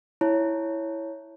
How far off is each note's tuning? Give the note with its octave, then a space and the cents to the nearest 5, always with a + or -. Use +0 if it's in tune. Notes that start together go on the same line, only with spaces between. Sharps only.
E4 +0 C#5 +0 A5 +0